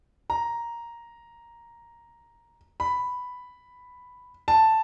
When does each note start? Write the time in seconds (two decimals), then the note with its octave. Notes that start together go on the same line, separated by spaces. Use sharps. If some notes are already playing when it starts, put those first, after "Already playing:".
0.30 A#5
2.80 B5
4.48 A5